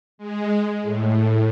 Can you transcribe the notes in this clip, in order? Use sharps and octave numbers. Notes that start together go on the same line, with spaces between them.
G#3
A2